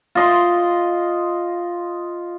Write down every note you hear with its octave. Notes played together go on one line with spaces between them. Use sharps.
F4 D#5 C6